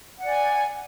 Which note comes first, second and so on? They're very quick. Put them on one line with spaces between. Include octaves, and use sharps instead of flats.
F#5 D5 G#5